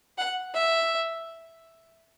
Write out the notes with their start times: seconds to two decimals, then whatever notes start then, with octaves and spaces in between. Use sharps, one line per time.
0.18 F#5
0.54 E5